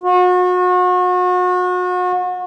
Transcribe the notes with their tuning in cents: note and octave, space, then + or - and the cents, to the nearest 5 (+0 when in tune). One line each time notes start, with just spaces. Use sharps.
F#4 -35